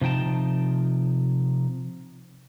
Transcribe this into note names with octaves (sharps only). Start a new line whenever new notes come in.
C3 F3 D#4 G5 A5